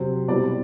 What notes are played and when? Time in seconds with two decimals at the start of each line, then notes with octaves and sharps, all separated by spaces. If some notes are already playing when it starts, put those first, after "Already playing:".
Already playing: C3 F#3 C4
0.28 B2 G3 C4 E4 D5